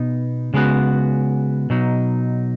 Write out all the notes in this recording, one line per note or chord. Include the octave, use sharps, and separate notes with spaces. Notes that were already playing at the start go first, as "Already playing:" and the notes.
Already playing: B2 B3 D#4
C#3 G#3 B3 F#4
B2 F#3 D#4